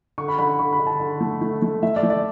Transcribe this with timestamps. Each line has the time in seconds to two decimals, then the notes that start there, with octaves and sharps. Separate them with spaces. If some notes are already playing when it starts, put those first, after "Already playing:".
0.18 D3 C#6
0.28 B5
0.38 D3 B5
0.59 D3 C#6
0.72 B5
0.79 D3
0.87 A5
1.00 D3
1.21 A3
1.42 A3
1.62 A3
1.83 A3 E5
1.96 D5
2.03 A3
2.10 D5